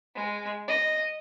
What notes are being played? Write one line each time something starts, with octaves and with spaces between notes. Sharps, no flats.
G#3
D#5